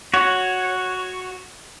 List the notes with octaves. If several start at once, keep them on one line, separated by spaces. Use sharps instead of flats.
F#4 C#5